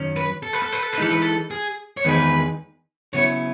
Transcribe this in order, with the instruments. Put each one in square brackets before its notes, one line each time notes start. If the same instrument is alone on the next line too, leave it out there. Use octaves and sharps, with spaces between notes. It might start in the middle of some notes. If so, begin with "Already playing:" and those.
Already playing: [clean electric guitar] F#2 D#3 F#3 C#4
[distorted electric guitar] B4
A4
B4
A4
B4
A4
B4
[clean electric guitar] E3 G#3 D#4 [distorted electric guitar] A4
[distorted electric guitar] B4
A4
G#4
C#5
[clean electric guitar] E2 D#3 G#3 D#4 G#4 [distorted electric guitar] B4
[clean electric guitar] C#3 F#3 B3 E4 [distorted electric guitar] C#5